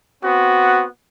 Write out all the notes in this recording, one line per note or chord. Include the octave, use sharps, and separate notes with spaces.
B3 C4 F#4